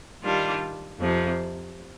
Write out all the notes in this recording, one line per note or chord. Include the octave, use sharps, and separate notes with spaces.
D#3 G3 D4 F4
F2 C3 F3